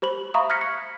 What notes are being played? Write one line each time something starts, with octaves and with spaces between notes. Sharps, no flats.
G4 C5 B5 F#7
E5 F5 A#5 B5 C#6 D#6
F6 F#6 G#6 A#6 B6 C#7
C#7